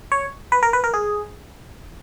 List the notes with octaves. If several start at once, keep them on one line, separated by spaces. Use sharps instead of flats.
C#5
B4
A#4
B4
A#4
G#4